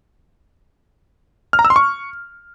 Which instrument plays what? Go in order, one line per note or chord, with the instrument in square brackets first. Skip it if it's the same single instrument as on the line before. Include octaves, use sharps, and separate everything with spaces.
[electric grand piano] F6
A#5
E6
C6
C#6